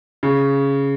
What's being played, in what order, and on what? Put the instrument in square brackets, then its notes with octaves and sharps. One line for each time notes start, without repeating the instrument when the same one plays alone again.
[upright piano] C#3